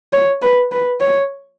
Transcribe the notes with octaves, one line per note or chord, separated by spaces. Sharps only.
C#5
B4
B4
C#5